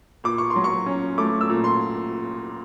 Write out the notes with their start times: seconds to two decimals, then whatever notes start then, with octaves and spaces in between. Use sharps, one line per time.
0.24 A#2 D6
0.38 C#6
0.50 C6
0.56 F#3
0.64 C#6
0.86 C#4
1.18 A3 D6
1.41 E6
1.50 A#2
1.64 C6